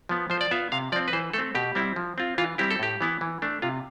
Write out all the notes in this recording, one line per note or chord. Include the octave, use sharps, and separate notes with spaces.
F3 B3
F3 C5
D5
B3 F4 E5
C3 F5
F3 C4 D5
B4
E3 C5
A3 C4 A4
B2 G4
G3 C4 E4
F3
C4 F4
E3 F4
G3 C4 E4 G4
A4
A2 G4
E3 B3 E4
E3
A3 D4
C3 F4